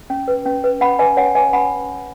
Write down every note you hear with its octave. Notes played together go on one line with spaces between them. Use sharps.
C#4
B4
C#4
B4
C#4 F#5 B5
B4 D#5 G#5
C#4 C#5 F#5
B4 D#5 G#5
C#4 F#5 B5